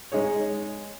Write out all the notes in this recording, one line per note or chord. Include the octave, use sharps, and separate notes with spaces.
G#3 D#4 G#4 C#5